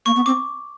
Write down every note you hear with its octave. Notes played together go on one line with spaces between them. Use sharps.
A#3 C#6
B3
C4 D6